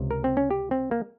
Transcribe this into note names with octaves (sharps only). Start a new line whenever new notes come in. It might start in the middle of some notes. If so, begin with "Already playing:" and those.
Already playing: C#2 C3
A#4
C4
C#4
G4
C4
A#3